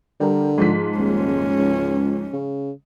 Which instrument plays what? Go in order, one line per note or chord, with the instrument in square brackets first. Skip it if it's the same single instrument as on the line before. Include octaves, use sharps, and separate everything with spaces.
[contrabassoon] D3 [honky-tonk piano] G3 A#4
[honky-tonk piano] G#2 F3 B6
[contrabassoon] D#1 [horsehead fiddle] C#4
[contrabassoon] C#2
C#3